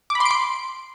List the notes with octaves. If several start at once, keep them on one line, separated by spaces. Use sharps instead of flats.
D6
B5
C6
D7
C6